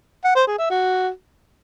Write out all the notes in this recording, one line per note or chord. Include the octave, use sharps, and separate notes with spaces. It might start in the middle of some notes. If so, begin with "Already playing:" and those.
F#5
C5
G#4
E5
F#4